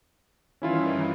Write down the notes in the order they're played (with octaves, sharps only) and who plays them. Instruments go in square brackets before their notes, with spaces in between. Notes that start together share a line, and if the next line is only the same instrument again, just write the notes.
[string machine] G2 D#3 E3 [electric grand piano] C#4 E4 F4